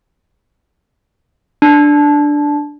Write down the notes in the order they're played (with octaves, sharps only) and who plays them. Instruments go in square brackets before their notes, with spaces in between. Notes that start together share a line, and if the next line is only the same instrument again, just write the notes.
[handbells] D4